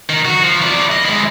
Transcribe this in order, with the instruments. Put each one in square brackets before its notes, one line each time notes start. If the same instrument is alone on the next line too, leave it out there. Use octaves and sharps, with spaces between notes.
[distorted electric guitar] D#3 D#4
F#4
F3
E4 D5
D#5
G#3 E4